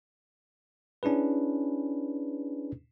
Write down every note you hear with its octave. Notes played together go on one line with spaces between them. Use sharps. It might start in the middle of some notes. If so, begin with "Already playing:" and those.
C#4 D4 E4 G#4 B4